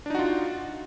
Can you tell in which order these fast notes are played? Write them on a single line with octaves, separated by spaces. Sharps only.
D4 D#4 F#4 F4